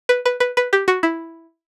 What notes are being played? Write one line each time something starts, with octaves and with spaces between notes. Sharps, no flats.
B4
B4
B4
B4
G4
F#4
E4